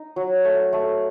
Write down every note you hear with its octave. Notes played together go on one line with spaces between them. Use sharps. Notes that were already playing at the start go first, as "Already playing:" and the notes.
Already playing: D#4
F#3
A3
A3